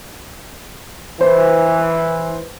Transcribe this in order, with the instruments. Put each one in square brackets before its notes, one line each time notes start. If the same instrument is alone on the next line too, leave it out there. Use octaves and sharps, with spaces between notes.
[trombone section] E3 [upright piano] B4 C5